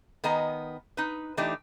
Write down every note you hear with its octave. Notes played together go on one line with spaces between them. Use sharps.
D#3 B3 D#5 G#5 A#5
D#4 B4
E3 A3 D4 D#4 G4